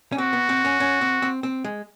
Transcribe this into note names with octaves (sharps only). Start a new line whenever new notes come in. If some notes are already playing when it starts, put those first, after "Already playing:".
C#4
C4 F#4
B3
C4
C#4
C#4
C4
C4
C4
G#3